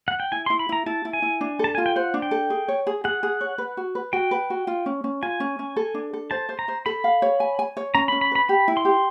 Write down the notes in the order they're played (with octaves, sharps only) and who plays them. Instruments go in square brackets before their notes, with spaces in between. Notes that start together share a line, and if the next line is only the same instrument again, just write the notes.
[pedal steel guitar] F#5
G5
[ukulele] E4 [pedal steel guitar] G#5
[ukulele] E4 [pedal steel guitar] C6
[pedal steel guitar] B5
[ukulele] E4 [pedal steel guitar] A#5
[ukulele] E4 [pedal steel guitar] A5
[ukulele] E4
[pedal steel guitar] G#5
[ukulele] E4
D4
[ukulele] A4 [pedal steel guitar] A5
[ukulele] F4 [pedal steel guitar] G#5
[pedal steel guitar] G5
[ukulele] C5 [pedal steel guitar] F#5
[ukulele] D4
[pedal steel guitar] G5
[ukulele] A4
G#4
C#5
G#4
[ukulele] G#4 [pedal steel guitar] F#5
[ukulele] G#4
C#5
B4
F#4
B4
[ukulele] F#4 [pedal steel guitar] G5
[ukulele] B4
F#4
F4
C#4
C#4
[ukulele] F4 [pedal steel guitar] G#5
[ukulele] C#4
C#4
A4
D4
A4
[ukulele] C5 [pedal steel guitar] A5
[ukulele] C5
[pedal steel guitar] A#5
[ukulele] C5
[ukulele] A4 [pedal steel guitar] B5
[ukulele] F5
C#5
G#5
G#5
C#5
[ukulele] C#4 [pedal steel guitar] A#5
[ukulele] C#4 [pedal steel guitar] B5
[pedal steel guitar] B5
[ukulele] B4 [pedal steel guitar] B5
[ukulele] G4 [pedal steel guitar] B5
[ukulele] E4
[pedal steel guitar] C6
[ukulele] G4